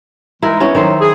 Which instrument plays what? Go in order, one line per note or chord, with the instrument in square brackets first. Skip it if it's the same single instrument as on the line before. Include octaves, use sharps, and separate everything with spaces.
[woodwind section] E3 G#3 D#4 [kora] E4 A#4
[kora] B3 C#4 E4
[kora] D#3 E4 C5 [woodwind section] F#3
[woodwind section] G#4